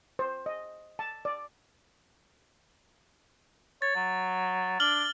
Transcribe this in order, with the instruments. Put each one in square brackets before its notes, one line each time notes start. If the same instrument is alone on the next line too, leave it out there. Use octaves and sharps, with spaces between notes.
[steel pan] C5
D#5
A5
D5
[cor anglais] C#5 [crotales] A6
[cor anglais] F#3
[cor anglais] D4 [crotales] F6 F#7 G7